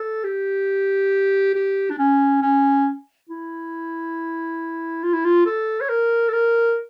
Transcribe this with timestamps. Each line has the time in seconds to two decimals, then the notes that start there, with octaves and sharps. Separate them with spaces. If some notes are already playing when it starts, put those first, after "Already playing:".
Already playing: A4
0.24 G4
1.55 G4
1.90 D4
1.99 C#4
2.42 C#4
3.29 E4
5.03 F4
5.14 E4
5.25 F4
5.46 A4
5.81 C#5
5.89 A#4
6.28 A4
6.33 A#4